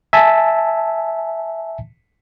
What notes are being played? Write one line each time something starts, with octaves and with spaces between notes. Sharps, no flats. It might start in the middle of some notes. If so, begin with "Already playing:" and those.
E5 G#5 A5